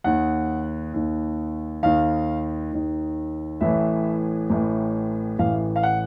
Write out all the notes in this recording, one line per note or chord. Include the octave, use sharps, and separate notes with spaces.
D#2 D#3 F#5
D#2 D#3
D#2 D#3 F5
D#2 D#3
A1 A2 E3 E5
A1 A2 E3
A1 A2 E3 F5
F5
F#5